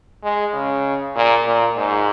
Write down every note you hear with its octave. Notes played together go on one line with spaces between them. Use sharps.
G#3
C#3
A#2
A#2
G#2